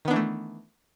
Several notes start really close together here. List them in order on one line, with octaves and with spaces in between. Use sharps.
D#3 B3 D4 E3 A3